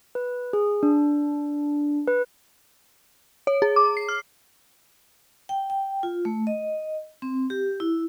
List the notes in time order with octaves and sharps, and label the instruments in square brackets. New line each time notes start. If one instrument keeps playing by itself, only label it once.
[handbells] B4
G#4
D4
B4
[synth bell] C#5
G#4
D6
C7
F6
[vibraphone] G5
G5
F4
A3
D#5
C4
G4
E4